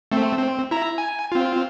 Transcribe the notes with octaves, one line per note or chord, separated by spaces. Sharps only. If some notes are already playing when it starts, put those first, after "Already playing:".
A3 C4
C4
E4 A#5
G#5
C4 F4